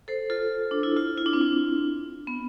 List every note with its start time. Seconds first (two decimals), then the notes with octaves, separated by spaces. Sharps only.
0.08 A4 C5
0.30 F4 A4
0.71 D4
0.83 E4
0.96 F4
1.18 E4
1.26 D4
1.33 C4
1.41 D4
2.27 B3